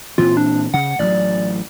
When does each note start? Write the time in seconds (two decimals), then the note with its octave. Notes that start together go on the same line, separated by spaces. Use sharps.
0.18 A#2 E3 C4 F4
0.37 D4
0.74 C#3 F#5
0.99 A1 F#3 D5